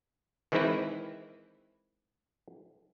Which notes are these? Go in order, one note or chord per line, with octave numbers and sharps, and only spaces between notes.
D#3 E3 G#3 C4 E4 B4